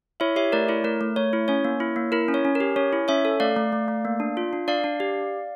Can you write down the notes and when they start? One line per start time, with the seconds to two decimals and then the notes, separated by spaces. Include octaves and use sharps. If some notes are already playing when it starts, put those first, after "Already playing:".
0.20 E4 C#5 E5
0.36 G4 C#5 E5
0.52 A3 A#4 D5
0.69 E4 C#5
0.84 A3 A#4
1.01 A3
1.16 A3 C#5
1.33 E4
1.48 C#4 C#5
1.65 A#3
1.80 E4
1.96 A#3
2.12 E4 A#4
2.28 C#4
2.34 C#5
2.45 C#4
2.55 A#4
2.60 G4
2.76 C#4 C#5
2.93 E4
3.08 C#4 C#5 E5
3.25 A4
3.40 A3 D5 F5
3.56 A3
3.72 A3
3.88 A3
4.05 A#3
4.20 D4
4.37 F4
4.53 D4
4.68 D4 D5 F5
4.84 D4
5.00 G4